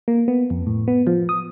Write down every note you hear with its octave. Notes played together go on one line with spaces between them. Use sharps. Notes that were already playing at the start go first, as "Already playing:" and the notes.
A#3
B3
F2
A2
B3
F3
D#6